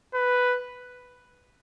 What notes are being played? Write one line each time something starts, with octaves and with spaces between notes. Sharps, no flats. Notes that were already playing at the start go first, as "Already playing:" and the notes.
B4